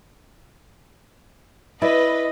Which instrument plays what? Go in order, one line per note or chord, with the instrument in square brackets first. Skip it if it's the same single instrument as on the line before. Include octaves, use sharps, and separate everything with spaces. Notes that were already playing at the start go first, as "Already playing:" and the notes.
[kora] E4 D5 [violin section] B4 [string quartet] D#5